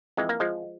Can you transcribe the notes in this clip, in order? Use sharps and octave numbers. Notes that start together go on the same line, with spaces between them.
F2 E3 G#3
A#3
F3 G#3